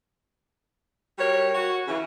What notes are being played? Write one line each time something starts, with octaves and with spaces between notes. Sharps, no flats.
G3 F#4 A#4 C#5
F#4
C#3 E3